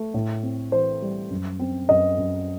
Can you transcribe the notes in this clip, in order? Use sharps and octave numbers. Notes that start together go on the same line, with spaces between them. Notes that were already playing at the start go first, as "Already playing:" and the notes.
Already playing: A3
A2
C4
E3 C5
G3
F#2
C4
F#2 D#5
F#2